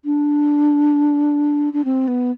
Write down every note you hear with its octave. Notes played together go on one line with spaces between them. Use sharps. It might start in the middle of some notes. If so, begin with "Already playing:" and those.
D4
D4
C4
B3